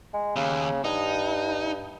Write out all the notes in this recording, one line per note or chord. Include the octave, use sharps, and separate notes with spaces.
G#3
D#2 C#3
G2 D#4